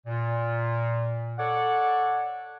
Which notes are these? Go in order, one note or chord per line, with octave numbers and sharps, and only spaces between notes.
A#2
A4 C#5 D5 F#5